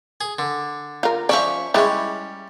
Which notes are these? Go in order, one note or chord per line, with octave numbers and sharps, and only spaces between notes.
G#4
D3
F4 A#4
F3 C#4 D5 E5 C#6
G3 G#3 C#4 E4